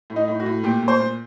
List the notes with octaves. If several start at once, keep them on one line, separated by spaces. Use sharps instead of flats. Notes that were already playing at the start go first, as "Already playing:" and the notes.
A2
D#4
A2
F#4
A2
A#2 G4
A#2
C5
A#2